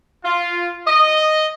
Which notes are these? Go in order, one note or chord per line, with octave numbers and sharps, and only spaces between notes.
F4
D#5